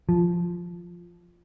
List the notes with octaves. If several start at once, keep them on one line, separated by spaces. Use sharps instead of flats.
F3